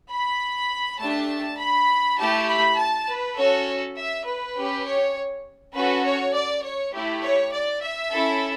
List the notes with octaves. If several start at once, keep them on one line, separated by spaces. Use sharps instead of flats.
B5
A3 D4 G4 A5
B5
A3 E4 G4 A5
B5
A5
B4
C#4 F#4 A4 C#5
E5
B4
C#4 G4
C#5
C#4 F#4 A4 B4
C#5
D5
C#5
A3 E4 G4
C#5
D5
E5
C#4 E4 A4